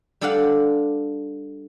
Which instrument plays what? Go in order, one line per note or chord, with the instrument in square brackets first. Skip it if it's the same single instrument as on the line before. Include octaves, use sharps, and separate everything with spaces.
[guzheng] G3 D4 A4 D5 F5 F#5